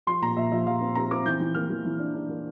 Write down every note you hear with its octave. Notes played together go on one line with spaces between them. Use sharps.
F3 C6
A#2 A#5
A#2 E5
F3 E5
F3 F5
C4
C4 A#5
C4 D6
E3 G6
E3
A#3 F6
E3
E3
D4
D4
A#3